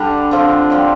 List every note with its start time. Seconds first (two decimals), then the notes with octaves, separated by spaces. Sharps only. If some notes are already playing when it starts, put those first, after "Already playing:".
Already playing: D3 G3 D4 G4
0.31 D3 F3 C4 F4
0.70 G3 C4 G4 D5